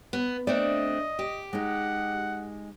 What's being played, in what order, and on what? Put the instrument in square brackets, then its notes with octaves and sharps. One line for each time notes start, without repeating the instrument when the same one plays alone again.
[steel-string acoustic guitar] B3
[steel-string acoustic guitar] A3 C4 D4 [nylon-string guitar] D5 [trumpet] D#5
[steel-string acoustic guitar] G4
[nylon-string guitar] G#3 D#4 [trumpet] F#5